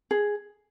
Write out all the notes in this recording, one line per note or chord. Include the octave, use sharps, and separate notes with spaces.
G#4